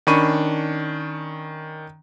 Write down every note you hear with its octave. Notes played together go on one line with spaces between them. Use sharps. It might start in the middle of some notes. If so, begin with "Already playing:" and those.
D#3 C#4 D4 B5 C#6 D#7